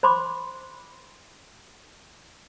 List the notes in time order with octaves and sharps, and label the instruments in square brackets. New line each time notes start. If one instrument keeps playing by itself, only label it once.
[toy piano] C5 B5 C6 D6